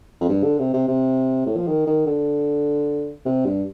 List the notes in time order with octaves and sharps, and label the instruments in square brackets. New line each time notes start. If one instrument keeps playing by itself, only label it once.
[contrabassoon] F2
G2
D3
C3
C3
C3
A2
F3
D#3
D#3
D3
C3
G2